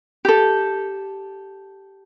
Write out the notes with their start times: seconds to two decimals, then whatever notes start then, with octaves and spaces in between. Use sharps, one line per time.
0.25 G4 A4